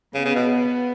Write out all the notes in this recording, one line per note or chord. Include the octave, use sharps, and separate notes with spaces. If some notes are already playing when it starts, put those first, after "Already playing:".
C#3 B3
C#3
B2